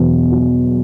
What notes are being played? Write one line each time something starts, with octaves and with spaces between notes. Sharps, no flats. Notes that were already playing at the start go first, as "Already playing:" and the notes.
Already playing: E2 B2
F#3